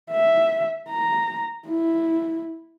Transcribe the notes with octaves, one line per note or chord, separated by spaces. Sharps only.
E5
A#5
E4